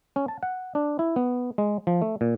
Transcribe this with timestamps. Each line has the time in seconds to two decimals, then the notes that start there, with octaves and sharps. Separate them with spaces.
0.16 C#4
0.28 A5
0.43 F#5
0.75 D4
0.99 E4
1.16 B3
1.58 G#3
1.87 F3
2.02 A3
2.21 A#2